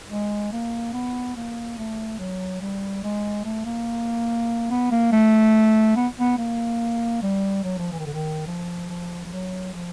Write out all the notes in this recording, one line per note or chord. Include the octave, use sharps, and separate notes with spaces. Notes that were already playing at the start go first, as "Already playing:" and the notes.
G#3
A#3
B3
A#3
A3
F#3
G3
G#3
A3
A#3
B3
A#3
A3
B3
B3
A#3
G3
F#3
F3
E3
D#3
D3
D#3
F3
F3
F3
F#3
F3